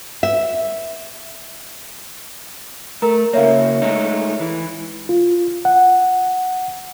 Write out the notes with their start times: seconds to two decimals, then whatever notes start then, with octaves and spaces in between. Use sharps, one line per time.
0.23 E5
3.02 A3 A#4 A#5
3.33 C#3 A#3 C#5 E5 F5
3.82 G#3 A3 D#4
4.40 E3
5.09 F4
5.65 F#5